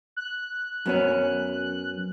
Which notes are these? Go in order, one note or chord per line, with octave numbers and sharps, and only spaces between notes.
F#6
F#2 B3 C#4